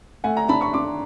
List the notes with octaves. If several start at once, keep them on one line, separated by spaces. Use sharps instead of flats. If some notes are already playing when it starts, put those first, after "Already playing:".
A3 F#5 G#5
G#5 A#5
D4 A5 B5
B5 C#6
D4 C6 D6